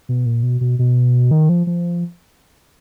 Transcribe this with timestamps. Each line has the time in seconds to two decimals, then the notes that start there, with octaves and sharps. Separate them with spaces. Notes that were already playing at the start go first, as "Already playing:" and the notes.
0.09 B2
0.26 A#2
0.43 B2
0.61 B2
0.79 B2
1.31 D#3
1.49 F3
1.67 F3